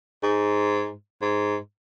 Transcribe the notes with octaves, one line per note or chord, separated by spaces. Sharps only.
G#2
G#2